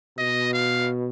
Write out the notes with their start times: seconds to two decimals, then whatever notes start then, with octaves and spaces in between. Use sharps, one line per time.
0.18 B2 D#5
0.53 F5